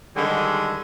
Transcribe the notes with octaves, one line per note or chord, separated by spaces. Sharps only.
D3 D#3 G3 G#3